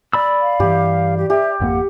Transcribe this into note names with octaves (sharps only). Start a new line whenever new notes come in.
D5 B5 E6
F5
G2 E3 G4
G4
G4 E5
G#1 F2 A#3 F#5